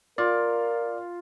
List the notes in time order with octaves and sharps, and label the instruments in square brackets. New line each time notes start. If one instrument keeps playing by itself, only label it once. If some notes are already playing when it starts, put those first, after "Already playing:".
[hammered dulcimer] F4 [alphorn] A#4 [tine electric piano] D5